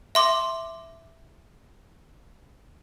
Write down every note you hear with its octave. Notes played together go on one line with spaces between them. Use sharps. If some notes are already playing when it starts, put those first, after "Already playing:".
E5 C6 D6